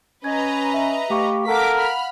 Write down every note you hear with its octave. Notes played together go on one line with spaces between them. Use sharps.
C#4 B4 D#5 A#5 G#6
E5
A3 G4 F5 C#6
A4 A#4 F5 F#5 D6 B6
B5 F6